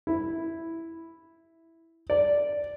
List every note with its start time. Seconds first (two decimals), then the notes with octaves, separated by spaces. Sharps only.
0.07 E4
2.10 D5